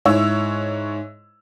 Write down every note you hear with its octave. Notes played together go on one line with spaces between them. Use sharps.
G#2 E4 C#5 E6